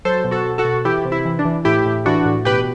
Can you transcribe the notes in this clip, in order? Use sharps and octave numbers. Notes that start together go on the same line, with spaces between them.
F#3 A4 C5
B2
F#4 A4
B2
F#4 A4
B2
E3 E4 G4
C3
E4
E3
D4
E3
A2 E4 G4
A2
E3 D4 F#4
A2
B2 G4 B4